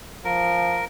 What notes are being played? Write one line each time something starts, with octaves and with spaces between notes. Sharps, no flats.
F3 A#4